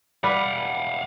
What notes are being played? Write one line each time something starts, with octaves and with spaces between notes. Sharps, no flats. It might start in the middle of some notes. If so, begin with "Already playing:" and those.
G3 B4 F5 F#5